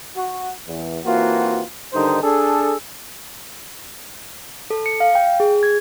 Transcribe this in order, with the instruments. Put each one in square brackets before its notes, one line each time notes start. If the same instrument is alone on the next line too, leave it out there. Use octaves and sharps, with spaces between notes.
[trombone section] F#4
E2
E3 A#3 C4 F4 F#4
G2 D3 D#3 D#4 G4 C5
D4 G#4 A4
[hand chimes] A4
C#7
F5
G5
G#4
G#6